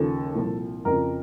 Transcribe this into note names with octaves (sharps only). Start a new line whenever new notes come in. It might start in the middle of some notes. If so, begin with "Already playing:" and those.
Already playing: D#2 C#3 F3 A4
C2 A#2 F3
F2 C#3 F3 A#4